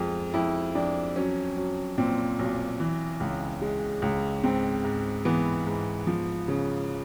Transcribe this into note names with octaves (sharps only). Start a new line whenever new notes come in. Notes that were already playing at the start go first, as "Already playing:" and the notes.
Already playing: F2 G#3 F4
F2 E4
F2 D4
F#3 C#4
F#3
A#2 C4
B1
E3
C#2
G#3
C#2
G#2 C4
G#2
E3 B3
G#2
F3
C#3